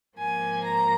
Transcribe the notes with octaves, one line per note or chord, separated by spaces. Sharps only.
G#2 F3 A#3 G#5
A#5